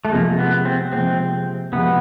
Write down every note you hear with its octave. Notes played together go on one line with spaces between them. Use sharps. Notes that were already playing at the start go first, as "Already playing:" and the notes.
A3
C3 F3 G#3 A#3
B3
C4
C3 F3 G#3 C4
C3 F3 G#3 B3